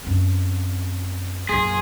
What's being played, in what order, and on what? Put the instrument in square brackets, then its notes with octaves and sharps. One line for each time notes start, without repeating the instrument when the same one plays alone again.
[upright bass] F#2 C4
[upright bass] A#1 F#2 [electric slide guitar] G#4 [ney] C6